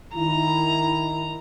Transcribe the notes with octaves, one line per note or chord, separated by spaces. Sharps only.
D#3 E4 A#5